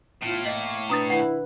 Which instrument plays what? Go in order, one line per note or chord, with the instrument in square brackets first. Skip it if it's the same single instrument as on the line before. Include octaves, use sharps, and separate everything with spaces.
[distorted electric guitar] A2 [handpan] B3 E4 [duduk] F4
[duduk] A#3 [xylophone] D#5 F#7
[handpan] B2 D4 B4 [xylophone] A#5 D#6 A6
[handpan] D#3 B4 [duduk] E4 [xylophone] F#5